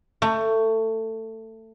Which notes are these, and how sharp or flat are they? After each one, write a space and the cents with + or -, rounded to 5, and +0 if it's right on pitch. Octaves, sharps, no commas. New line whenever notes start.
A3 +20